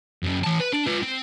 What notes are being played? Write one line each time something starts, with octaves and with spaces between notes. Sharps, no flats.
F#2 C#3
E3 A5
B4
D4
F4 B4
C4